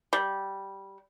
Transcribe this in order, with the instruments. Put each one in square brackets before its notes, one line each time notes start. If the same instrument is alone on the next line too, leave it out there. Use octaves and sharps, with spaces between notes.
[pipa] G3